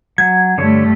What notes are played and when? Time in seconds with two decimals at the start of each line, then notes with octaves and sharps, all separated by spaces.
0.18 F#3 G#6
0.58 G2 D3 A3 C#5